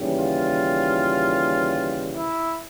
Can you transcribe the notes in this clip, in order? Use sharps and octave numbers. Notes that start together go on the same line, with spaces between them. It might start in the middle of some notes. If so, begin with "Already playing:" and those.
Already playing: D#2 C#3 E3 G3
F4
E4